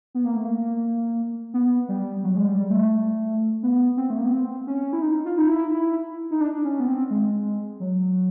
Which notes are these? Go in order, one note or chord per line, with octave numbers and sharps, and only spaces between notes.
B3
A#3
A3
A#3
B3
G3
F#3
G#3
G3
A3
B3
C4
A3
A#3
B3
C4
C#4
E4
D#4
F4
D#4
E4
E4
D#4
D4
C#4
B3
C4
G#3
F#3